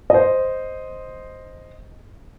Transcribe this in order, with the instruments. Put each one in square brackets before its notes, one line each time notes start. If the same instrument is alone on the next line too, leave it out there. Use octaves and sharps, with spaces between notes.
[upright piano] C5 D#5